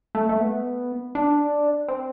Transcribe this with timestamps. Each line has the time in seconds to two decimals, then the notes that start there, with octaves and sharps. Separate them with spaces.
0.15 A3
0.29 A3
0.40 B3
1.15 D4
1.88 C4